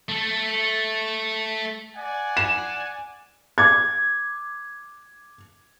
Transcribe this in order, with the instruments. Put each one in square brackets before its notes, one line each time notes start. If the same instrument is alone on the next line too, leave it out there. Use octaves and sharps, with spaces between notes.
[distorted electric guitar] A3 A4
[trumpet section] D5 F#5 G#5
[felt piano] E7
D6 G#6